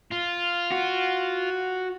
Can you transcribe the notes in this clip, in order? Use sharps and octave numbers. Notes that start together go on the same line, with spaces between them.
F4
F#4